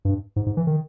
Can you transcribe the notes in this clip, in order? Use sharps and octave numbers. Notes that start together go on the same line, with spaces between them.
G2
G#2
G#2
E3
D#3